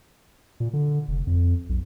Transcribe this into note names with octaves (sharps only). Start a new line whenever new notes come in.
A#2
D3
F1
F2
B1